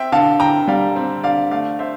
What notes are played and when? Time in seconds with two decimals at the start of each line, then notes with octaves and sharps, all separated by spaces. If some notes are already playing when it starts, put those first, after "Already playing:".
Already playing: C4 E5 G5
0.12 D3 F5 A5
0.40 D3 G5 A#5
0.68 G3 D5 F5
0.96 C4
1.23 D3 D5 F5
1.51 A3 D5 F5
1.79 C5 E5